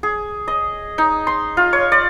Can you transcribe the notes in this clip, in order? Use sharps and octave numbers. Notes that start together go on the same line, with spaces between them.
G#4
D#5
D#4
C6
F4
C#5
D5